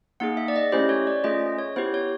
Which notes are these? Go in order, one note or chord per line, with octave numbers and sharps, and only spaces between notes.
A#3 D#4 G#4 F#5
E5
D5
D#5
A3 C#4 E4 G4 C5
C#5
D5
A3 C#4 F4 G#4 D#5
C#5
B3 E4 G4 C5
C#5